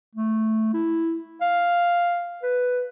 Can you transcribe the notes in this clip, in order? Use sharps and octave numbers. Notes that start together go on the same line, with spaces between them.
A3
E4
F5
B4